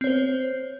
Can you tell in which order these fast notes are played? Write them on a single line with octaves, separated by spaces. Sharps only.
C4 C#5 C5